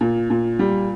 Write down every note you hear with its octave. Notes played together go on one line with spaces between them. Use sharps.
A#2
A#2
G3